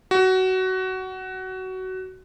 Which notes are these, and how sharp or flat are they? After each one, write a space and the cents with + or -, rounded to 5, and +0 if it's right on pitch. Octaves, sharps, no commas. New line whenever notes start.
F#4 +20